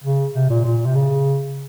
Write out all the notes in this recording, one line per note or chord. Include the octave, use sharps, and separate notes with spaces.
C#3
C3
A#2
A#2
C3
C#3